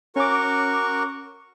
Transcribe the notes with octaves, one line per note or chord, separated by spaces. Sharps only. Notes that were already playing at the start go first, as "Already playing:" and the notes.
C#4 F#4 A#4 C#6 D6